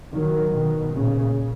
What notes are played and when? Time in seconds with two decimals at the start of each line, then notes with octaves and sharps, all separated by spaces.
0.13 D#3 F#3
0.53 B2 D#3
0.93 A#2 C#3